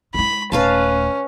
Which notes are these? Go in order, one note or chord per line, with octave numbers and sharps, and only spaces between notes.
G#3 E4 B5
D#1 A3 C#4 B4 F5 A5